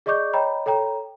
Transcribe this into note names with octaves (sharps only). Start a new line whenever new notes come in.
G#4 D5 D#5 C#6 D6 G6
C#5 D#5 G5 A#5 B5
A4 C#5 G5 A#5